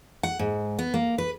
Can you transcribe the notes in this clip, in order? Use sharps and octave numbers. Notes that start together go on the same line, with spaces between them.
F#5
G#2
B3
A#3
B4